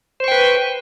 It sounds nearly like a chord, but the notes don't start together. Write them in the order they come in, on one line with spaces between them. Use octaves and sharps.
C5 C#6 G5 B4